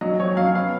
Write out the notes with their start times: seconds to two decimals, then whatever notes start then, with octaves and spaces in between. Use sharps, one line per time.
0.01 F#3 D#5
0.20 F2 C#5
0.36 F#3 F5
0.54 B3 F5